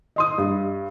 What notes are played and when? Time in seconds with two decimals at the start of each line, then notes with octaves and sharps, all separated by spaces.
0.16 D#5 C6 D#6
0.38 G2